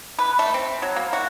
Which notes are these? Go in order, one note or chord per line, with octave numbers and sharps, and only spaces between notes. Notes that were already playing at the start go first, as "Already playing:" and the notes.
B4
A3
C4
F#3
A#3
F#4